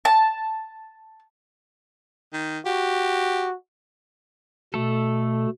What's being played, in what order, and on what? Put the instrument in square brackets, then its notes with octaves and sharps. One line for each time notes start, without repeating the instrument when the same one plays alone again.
[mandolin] A5
[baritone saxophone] D#3
[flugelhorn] F#4 [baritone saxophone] G4
[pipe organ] B2 [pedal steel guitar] A3 A4